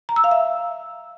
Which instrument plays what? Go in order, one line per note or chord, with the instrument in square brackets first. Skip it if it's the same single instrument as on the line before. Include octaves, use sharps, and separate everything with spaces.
[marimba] A#5
E6
F5
E5